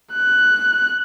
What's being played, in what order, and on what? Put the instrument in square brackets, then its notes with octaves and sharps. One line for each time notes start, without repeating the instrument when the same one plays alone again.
[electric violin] F#6